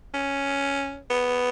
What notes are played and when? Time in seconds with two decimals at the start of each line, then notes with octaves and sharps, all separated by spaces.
0.14 C#4
1.10 B3